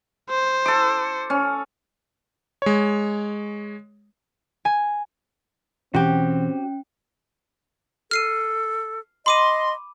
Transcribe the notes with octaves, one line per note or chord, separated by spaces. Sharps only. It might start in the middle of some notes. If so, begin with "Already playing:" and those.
C5
A4 D6
C#4
G#3 C#5
G#5
B2 E3 C4 C#4 F#4 G4 G5
A4 F6 C7 D#7
D#5 B5 C6 D6 D#7